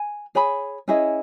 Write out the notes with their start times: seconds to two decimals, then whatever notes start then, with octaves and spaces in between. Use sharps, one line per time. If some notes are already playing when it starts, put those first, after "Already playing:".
Already playing: G#5
0.35 G#4 C#5 G#5 B5
0.88 C#4 E4 G#4 D#5